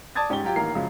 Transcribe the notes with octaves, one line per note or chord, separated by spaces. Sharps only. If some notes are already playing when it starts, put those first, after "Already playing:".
D5 A5 D6 D#6 G#6 A6
G#2 C#4 G4 C#5 G7
F#3 F4 G4
A1 D#3 A#3 A#4 C7
F#2 C#3 F3 F#3 G#3